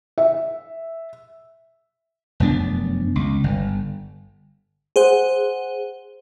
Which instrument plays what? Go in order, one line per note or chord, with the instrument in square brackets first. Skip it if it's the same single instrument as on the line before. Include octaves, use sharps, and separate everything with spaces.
[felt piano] E5
[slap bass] F1 F#2 B3 D4
C#2
G1
[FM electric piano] G#4 C5 F#5